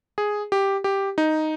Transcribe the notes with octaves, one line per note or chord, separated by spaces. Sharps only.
G#4
G4
G4
D#4